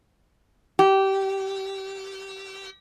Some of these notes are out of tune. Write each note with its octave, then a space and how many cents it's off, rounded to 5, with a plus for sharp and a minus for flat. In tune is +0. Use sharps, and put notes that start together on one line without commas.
G4 -20